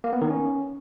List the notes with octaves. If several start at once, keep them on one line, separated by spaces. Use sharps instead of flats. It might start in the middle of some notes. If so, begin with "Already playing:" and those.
A#3
B3
D#3
C#4